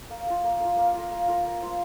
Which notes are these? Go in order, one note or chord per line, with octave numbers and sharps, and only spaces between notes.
A#3
F4 A#4
A#3
F4 A#4
A#3
F4 A#4
A#3
F4 A#4
A#3
F4 C5